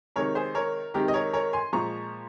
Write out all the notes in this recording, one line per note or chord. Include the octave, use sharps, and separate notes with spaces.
C3 D#3 G#3 A#4 C#5
G#4 C5
A#4 C#5
C3 D#3 G#3 G4 A#4
D#5
A#4 C#5
A#4 C#5
G#5 C6
A#2 F3 G#3 A#5 C#6